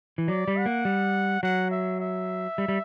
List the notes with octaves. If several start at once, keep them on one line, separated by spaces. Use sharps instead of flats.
E3
F#3 D5
G3
F#5
A#3
G3
F#3 F#5
E5
E5
G3
G3